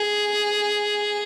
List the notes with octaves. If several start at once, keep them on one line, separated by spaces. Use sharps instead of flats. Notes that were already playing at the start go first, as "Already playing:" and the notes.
Already playing: G#4